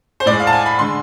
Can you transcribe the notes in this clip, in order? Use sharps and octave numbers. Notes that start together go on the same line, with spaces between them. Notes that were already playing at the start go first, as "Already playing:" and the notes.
C5
A2 G#3 D5
F5
A5
G#5
B5
D3 G#3 C6